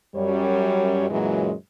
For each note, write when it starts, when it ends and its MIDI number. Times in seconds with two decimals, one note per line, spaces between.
0.15 1.08 42
0.15 1.08 55
0.15 1.08 73
1.10 1.53 42
1.10 1.53 46
1.10 1.53 52
1.10 1.53 54
1.10 1.53 56